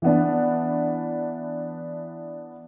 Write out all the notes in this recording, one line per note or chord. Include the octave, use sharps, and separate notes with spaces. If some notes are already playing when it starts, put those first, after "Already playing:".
E3 B3 D4